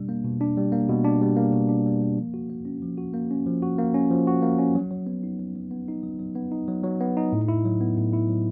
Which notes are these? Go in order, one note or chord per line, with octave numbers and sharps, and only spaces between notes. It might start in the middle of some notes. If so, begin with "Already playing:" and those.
Already playing: B2 G3 D4
A#3
B2
D4
G3
A#3
B2
D4
G3
A#3
B2
D4
G3
A#3
F3
F#4
A#3
C#4
F3
F#4
A#3
C#4
F3
F#4
A#3
C#4
F3
F#4
A#3
C#4
F#3
F#3
B3
D#4
F#3
F#3
B3
D#4
F#3
F#3
B3
D#4
F#3
F#3
B3
D#4
A2
E4
F#3
B3
A2
E4
F#3